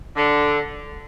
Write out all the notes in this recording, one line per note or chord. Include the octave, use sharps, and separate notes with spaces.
D3